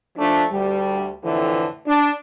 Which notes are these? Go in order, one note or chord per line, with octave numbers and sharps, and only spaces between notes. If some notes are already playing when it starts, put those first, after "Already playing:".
F3 A3 D4
D2 G3
F2 A2 D3 E3
D4